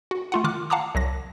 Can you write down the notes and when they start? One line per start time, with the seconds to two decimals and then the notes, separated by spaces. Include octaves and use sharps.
0.11 F#4
0.32 A3 F4 F#5
0.44 D#3 F4 D6 F6 F#6
0.70 F5 F#5 A5 A#5 D6 D#6
0.95 C2 F#3 A#6